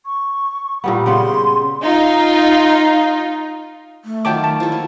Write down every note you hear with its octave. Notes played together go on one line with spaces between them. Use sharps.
C#6
A#2 G3 B3 B5
C#3 G3 B3 C6
D#4 F4
A3
D#3 F#3 F4 G5 A5 D6
A5
F3 E4 A4
A#3